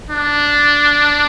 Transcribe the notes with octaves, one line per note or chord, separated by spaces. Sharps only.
D4